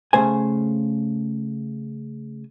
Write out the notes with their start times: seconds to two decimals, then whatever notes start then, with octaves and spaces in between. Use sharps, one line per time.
0.13 C#3 A3 C5 G#5